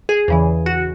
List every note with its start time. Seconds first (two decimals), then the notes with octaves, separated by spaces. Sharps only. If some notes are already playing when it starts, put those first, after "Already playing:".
0.09 G#4
0.28 E2 C#3 E3
0.66 F#4